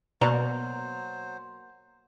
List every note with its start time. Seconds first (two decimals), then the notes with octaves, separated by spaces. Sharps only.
0.21 B2 F#3 A#3 C5 D5 A#5